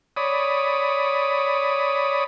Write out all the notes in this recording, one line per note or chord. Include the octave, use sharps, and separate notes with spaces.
C#5 D5 B5 D#6